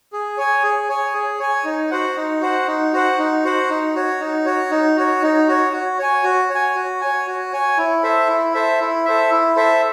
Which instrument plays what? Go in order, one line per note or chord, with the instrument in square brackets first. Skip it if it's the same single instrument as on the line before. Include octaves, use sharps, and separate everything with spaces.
[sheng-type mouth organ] G#4
C#5 G#5
G#4
C#5 G#5
G#4
C#5 G#5
D#4
F#4 C5 F#5
D#4
F#4 C5 F#5
D#4
F#4 C5 F#5
D#4
F#4 C5 F#5
D#4
F#4 C#5
D#4
F#4 C#5
D#4
F#4 C#5
D#4
F#4 C#5
F#4
C#5 G#5
F#4
C#5
G#5
F#4
C#5 G#5
F#4
C#5 G#5
E4
A4 C5 E5
E4
A4 C5 E5
E4
A4 C5 E5
E4
A4 C5 E5